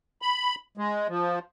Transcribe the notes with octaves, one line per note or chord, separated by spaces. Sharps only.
B5
G#3
F3